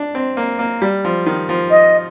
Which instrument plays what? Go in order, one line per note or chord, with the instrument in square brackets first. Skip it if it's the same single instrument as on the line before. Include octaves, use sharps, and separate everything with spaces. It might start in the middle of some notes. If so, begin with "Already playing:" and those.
Already playing: [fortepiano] D4
C4
A#3
A#3
G3
F3
D#3
F3
[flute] D#5